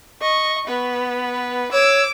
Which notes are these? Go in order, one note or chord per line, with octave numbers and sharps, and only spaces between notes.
D#5 C#6
B3 B4
C#5 D6 E6